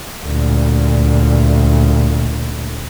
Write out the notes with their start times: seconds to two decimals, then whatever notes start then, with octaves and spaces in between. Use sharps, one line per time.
0.25 D2 A#2